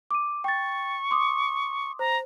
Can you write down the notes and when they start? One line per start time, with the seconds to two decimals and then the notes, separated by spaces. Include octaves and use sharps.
0.11 D6 D#7
0.44 G5 C#6 A6
1.11 C6 D6 D#6
1.99 C5 A#5